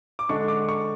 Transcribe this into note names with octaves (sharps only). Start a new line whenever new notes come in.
D6
D3 G#3 D4 C#6
D6
C#6